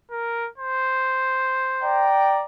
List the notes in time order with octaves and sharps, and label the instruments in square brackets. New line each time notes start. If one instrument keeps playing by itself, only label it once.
[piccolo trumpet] A#4
C5
[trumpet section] D5 G5 A#5